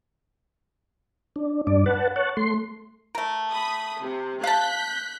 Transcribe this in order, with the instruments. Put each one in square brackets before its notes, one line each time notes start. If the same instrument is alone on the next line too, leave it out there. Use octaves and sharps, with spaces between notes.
[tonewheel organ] D4
G2 D4 D5
B4 F#5 A5
C#5 F#5 A5
A3 C6
[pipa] A3 A#4
[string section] B5 D#6
C3
[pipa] F5 A5 [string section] F#6 G6 B6